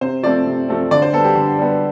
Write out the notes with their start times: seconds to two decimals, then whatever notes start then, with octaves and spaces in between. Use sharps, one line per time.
0.01 C3 C5
0.23 F3 A3 C4 D5
0.46 C3
0.69 F3 A3 C4
0.91 D3 D5
1.02 C5
1.13 B3 A4
1.18 G3
1.25 G4
1.36 D3
1.58 G3 B3